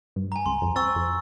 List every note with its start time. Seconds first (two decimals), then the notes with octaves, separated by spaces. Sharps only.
0.16 G2
0.32 G#5 A#5
0.46 C#2 C6
0.62 F2
0.76 C4 C#6 E6 A6
0.96 F2